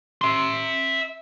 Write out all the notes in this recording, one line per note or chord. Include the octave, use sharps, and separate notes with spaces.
E5 C6